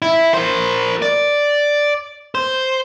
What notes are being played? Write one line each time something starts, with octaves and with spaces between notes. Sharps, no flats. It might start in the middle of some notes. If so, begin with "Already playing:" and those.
E4
A#4 C5
D5
C5